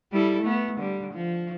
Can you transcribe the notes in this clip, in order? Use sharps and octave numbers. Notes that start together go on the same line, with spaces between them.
G3 E4 A4
A3 B3
D3 G3
F3